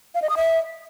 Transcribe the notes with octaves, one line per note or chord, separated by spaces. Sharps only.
F5
D#5
D#6
E5